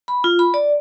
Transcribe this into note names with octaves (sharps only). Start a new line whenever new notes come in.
B5
F4
B5
D5